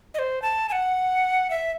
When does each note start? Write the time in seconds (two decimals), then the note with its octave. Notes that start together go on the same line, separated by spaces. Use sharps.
0.14 D#5
0.19 C5
0.42 A5
0.69 G#5
0.72 F#5
1.50 E5